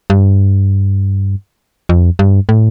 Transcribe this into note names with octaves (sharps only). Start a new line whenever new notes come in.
G2
F2
G2
A2